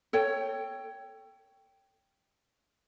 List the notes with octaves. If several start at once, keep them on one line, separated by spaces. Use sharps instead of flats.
A4 C#5 G5